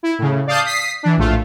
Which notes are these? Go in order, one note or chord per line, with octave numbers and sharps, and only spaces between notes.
E4
A2 C#3
D5 F5 A5 D#6 G6 C7
D#6 B6 C7
E3 D4
A#1 A2 A3 F4